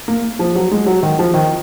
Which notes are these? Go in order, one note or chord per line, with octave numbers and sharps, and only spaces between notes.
A#3
F3
F#3
G#3
F#3
D#3
F3
D#3